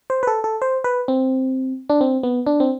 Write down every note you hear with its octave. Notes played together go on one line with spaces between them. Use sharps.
C5
B4
A4
A4
C5
B4
C4
D4
C4
B3
D4
C4